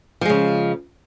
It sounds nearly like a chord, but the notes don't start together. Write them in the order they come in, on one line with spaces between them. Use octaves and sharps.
F3 G#3 C#3